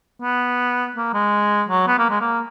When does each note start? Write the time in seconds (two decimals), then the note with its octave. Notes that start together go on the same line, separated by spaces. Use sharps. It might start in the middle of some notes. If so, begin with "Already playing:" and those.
0.22 B3
0.96 A#3
1.14 G#3
1.69 F#3
1.87 B3
1.98 A#3
2.10 G#3
2.21 A#3